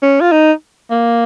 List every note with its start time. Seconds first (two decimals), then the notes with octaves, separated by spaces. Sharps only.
0.03 C#4
0.21 F4
0.32 D#4
0.91 A#3